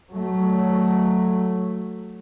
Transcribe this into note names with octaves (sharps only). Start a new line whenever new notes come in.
F#3 A3